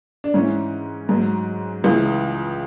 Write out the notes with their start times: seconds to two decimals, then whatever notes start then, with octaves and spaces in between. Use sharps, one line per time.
0.24 D4
0.34 G#2 E3 C#4
1.09 G#2 F#3
1.84 C#2 C#3 E3